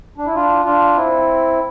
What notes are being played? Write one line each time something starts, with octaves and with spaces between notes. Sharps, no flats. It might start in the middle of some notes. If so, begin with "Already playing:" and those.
D4
E4
D4 F4
D4 F4
C4 E4